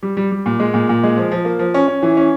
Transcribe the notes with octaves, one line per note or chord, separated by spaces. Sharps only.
G3
G3
G3
A#2
G#3
A#2
A#2
G#3
F3
F3
A#3
F3
C#4
C#4
E3
C#4